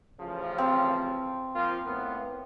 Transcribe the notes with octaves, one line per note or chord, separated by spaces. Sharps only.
A1 C#3 F3
C4
F3 A#3 F4
A2 A#3 B3